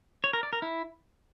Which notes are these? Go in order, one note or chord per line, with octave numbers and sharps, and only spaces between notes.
C#5
A#4
D5
A#4
E4